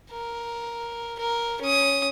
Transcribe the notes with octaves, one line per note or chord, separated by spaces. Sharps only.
A#4
A#4
C#4 D#6